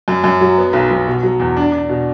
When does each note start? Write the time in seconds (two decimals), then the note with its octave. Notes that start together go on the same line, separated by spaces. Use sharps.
0.08 F#2
0.24 F#2
0.41 F#3
0.58 B3
0.73 B1
0.91 B1
1.07 B2
1.23 F#3
1.40 E2
1.57 D4
1.72 D4
1.89 B2